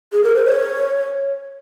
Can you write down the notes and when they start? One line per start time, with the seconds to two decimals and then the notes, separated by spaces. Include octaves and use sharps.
0.13 G#4
0.24 A#4
0.35 C5
0.46 C#5